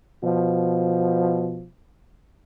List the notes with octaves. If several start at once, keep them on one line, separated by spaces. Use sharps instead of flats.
B2 F3